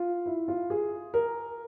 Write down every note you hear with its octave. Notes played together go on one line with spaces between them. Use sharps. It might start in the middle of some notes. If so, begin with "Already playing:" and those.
Already playing: F4
E4
F4
G#4
A#4